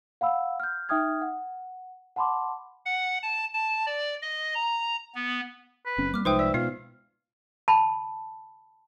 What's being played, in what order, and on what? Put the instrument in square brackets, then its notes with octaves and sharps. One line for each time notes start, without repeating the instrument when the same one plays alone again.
[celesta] F5 F#5 B5 E6
F6 G6
D#4 E5 G5 D#6 F6 G#6
F#5
F#5 A5 B5 C6 D6
[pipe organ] F#5
A5
A5
D5
D#5
A#5
B3
[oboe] B4
[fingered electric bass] F#1 C4 C#4
[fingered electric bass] G3 A#3 [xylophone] D6 F6
[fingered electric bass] C2 F3 [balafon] G#3 D#4 [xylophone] B4 C5 G5 [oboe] D#6
[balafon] D5 [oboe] E5
[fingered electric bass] B2 [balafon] F4 C5 [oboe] F5
[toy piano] A5 B5